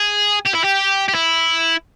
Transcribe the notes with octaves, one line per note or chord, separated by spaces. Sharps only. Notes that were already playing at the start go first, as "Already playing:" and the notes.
Already playing: G#4
G4
E4
G4
G4
E4